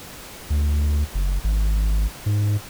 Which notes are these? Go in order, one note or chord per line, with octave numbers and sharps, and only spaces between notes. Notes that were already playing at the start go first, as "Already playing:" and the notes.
D2
F#1
G#1
G#2